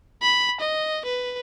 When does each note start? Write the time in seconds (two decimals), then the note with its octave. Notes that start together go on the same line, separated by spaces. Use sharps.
0.22 B5
0.60 D#5
1.05 B4